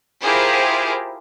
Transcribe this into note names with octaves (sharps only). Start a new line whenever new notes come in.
E4 F4 G4 G#4 A#4 C5